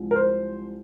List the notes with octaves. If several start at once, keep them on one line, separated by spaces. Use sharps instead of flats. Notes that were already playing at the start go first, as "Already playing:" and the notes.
Already playing: C2 F3 G#3
A#4
C5